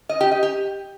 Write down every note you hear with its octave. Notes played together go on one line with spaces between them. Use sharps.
D#5
G4
D#5
G4